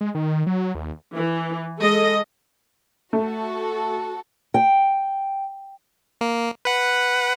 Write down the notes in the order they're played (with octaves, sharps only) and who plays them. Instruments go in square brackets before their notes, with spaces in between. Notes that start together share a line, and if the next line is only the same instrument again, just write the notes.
[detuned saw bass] G#3
D#3
F#3
D#2
[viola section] E3
G#3 A4 D#5
[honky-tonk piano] A3 [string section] F#4 A4
[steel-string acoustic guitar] G5
[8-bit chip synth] A#3
B4 F#5